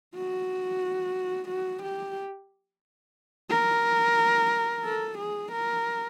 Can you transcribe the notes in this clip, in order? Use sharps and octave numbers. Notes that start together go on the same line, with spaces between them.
F#4
F#4
G4
A#4
A4
G#4
A#4